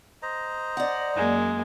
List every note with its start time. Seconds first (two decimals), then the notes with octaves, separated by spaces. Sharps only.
0.22 C5 D#5 A#5
0.77 D5 F#5
1.16 F#2 G#3 A#3